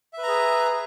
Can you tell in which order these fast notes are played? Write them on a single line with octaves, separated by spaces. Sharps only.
E5 B4 A#5 G#4